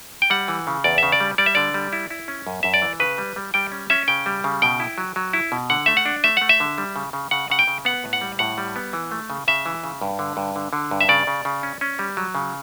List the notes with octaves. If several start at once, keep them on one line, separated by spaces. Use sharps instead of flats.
G5
G3 F#5
E3
C#3
E2 D5
C#3 E5
D5
G3
G3 D5
E5
D3 D5
G3
E4
E4
C#4
F#2
F#2 E5
D5
E3
C#3 B4
G3
G3
G3 G5
C#4
C#4 E5
C#3 G5
G3
C#3
B2 G5
E4
F#3
F#3
E4
B2
D3 F#5
A3 E5
F#5
D4
A3 E5
A3 F#5
E5
D3
G3
C#3
C#3
C#3 F#5
C#3 F#5
G5
C#3
B3 F#5
A2
F#5
G3
A2 F#5
G3
B3
E3
A3
C#3
C#3 E5
E3
C#3
G2
D3
G2
D3
D3
G2
E5
C#3 D5
C#3
C#3
C#4
C#4
G3
F#3
C#3